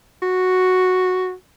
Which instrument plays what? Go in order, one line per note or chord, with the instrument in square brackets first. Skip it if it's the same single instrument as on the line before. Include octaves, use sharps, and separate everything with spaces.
[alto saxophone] F#4